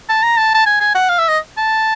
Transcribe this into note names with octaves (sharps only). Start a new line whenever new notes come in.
A5
A#5
A5
A5
G#5
G#5
F#5
F5
E5
D#5
A5